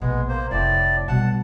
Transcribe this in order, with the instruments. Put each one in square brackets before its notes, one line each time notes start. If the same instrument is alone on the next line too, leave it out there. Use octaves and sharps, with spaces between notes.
[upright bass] A#1 B2 [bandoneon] G#3 B3
[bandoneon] A#3 C5
[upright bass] F1 [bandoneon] A2 D5
[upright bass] B2 G3 [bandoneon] F#5 A5